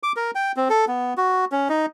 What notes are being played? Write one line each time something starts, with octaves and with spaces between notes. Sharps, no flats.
D6
A#4
G5
C4
A4
B3
F#4
C#4
D#4